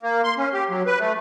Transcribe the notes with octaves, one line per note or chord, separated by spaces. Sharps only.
A#3
C6
C#4
G4
F#3
B4
A3